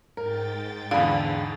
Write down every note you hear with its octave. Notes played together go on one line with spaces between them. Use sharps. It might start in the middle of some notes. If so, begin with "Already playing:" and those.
G#2 A#4 G5 A6
E2 D3 G#4 F5 B5